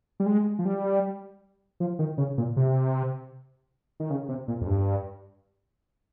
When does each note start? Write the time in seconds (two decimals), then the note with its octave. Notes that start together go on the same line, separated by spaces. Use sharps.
0.20 G3
0.26 G#3
0.59 F3
0.65 G3
1.80 F3
1.99 D#3
2.18 C#3
2.38 A#2
2.57 C3
4.00 D#3
4.10 C#3
4.29 C3
4.48 A#2
4.61 F2
4.67 G2